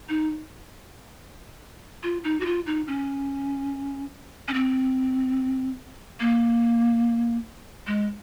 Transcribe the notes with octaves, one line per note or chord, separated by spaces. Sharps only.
D#4
F4
D#4
F#4
F4
D#4
C#4
C#4
C4
A#3
G#3